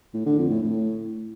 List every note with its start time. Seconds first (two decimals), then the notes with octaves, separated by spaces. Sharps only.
0.14 A2
0.26 D3
0.38 F2
0.50 A2
0.62 A2